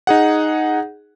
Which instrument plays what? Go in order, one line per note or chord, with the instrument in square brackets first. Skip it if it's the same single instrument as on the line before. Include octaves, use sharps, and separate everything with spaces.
[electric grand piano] D#4 G#4 F#5